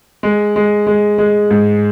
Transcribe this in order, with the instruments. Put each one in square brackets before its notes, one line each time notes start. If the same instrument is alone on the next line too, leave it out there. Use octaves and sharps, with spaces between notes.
[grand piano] G#3
G#3
G#3
G#3
G#2